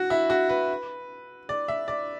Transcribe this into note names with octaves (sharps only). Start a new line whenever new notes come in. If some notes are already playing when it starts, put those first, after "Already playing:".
Already playing: F#4
E4
F#4
B4
D5
E5
D5